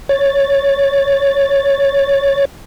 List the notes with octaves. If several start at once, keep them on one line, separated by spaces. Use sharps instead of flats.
C#5 A6